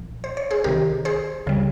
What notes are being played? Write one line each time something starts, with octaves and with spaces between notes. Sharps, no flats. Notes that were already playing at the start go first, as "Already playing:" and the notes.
Already playing: C2 A#2 F3
C5
C#5
G#4 C5
C2 C3 D#3 G4 A#4
G#4 C5
C#2 C#3 G3